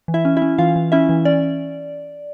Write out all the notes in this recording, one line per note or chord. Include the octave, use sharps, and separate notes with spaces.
E3
E4 E5
C#4
E4 E5
C#4
E3 F4 F5
E3
C#4 E4 E5
E3
C#4 D5